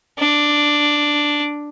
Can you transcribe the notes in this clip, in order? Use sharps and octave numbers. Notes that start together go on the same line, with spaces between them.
D4